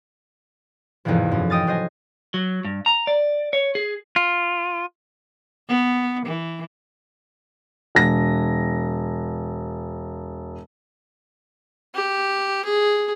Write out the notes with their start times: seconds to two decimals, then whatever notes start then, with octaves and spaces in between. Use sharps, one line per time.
1.05 A1 E2 G#2 C3 E3 F3
1.32 F#2
1.50 D#5 G5 D#6 F6 A6
1.67 F#3 C5 D#5 G#5
2.34 F#3
2.65 G2
2.86 A#5
3.07 D5
3.53 C#5
3.75 G#4
4.16 F4
5.69 B3
6.26 E3
7.95 E1 A#6
11.95 G4
12.65 G#4